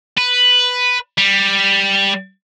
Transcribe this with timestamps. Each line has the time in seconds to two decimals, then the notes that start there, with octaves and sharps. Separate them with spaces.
0.18 B4
1.18 G3